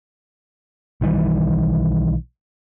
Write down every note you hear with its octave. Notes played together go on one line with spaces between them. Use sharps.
B1 D#3 E3 G3